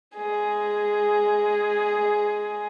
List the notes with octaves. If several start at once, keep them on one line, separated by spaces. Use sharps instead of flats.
G#3 G#4